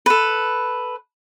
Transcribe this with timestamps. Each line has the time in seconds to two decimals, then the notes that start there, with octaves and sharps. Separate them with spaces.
0.06 A4 B4